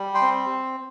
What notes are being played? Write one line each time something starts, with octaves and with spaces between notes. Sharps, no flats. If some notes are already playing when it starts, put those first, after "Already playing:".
Already playing: G3
G5 C6
C4